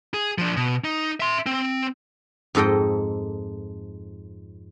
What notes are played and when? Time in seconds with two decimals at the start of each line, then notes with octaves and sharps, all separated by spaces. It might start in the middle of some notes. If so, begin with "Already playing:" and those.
0.14 G#4
0.38 F3 D4
0.57 B2
0.84 D#4
1.20 E5 C6
1.46 C4
2.55 F2 G#2 A4 D#5 G5